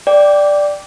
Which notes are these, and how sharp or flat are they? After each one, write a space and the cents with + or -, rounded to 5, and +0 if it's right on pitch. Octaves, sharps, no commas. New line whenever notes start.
D5 +0 G5 +0 D6 -15